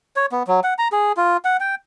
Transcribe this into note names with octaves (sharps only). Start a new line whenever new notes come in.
C#5
B3
F#3
F#5
A#5
G#4
F4
F#5
G5